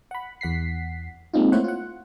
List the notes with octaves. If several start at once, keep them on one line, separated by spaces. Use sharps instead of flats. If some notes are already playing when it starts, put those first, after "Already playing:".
F#5 B5
E2 F#5 B6 C7
G#3 A#3 C4 D#4 F4
A3 A#3 E4 C5 C#5 F#5
F4 F#5